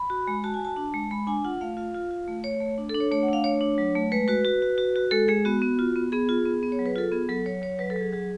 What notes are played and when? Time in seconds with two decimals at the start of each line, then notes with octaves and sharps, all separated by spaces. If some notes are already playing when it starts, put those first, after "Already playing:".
Already playing: B5
0.10 F#4
0.28 G#3
0.44 F#4 A5
0.54 G#5
0.60 F#4 A5
0.76 D4
0.94 G#3
1.11 G#3 B5
1.27 D4 G#5
1.45 F4 F#5
1.61 A3 F5
1.77 F4 F5
1.94 F4
2.11 F4
2.28 A3
2.44 A3 C#5
2.60 A3
2.78 D4
2.89 D4 A4
3.00 C#5
3.11 A3 C#5
3.23 F#5
3.28 D4 F5
3.44 A3 C#5
3.61 D4
3.78 F#3
3.95 A3
4.12 G#3 B4
4.28 F#4 B4
4.45 F#4
4.62 F#4
4.78 F#4
4.96 F#4
5.11 G#3 A4
5.28 G#3 G#4
5.45 B3 F#4
5.62 B3
5.79 F4
5.96 B3
6.12 B3 G#4
6.29 F4
6.45 B3
6.63 B3
6.72 C#5
6.79 F#3
6.86 B4
6.96 F4 A4
7.12 B3 G#4
7.28 F#3 A4
7.46 F#3 C#5
7.62 F#3 C#5
7.79 F#3 B4
7.90 A4
7.96 F#3 G#4
8.13 F#3 G#4